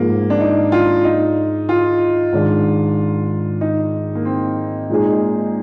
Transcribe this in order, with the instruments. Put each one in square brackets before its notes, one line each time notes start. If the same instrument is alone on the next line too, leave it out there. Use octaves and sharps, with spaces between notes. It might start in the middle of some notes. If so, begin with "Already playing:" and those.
Already playing: [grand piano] G#2 F3 G#3 [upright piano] A#3
[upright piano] D4
D#4
F4
D#4
F4
[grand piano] G#2 D#3 G#3 D4
[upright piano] D#4
A#3
C4
[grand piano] A#2 G#3 D#4 G#4